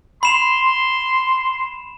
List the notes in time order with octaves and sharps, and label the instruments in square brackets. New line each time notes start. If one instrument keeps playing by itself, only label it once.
[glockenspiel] B5 E7 F7 [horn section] C6